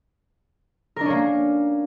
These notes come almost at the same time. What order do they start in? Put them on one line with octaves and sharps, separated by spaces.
A#4 D4 C#4 A#3